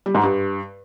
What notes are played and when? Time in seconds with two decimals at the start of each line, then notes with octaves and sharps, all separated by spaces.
0.06 G3
0.15 G#2
0.23 G2